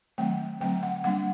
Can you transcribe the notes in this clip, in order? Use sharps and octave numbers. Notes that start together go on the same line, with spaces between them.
D#3 F#3 A3 C4 G5
D3 F#3 A3 C4 G5
F#5
G3 A#3 D4 F#5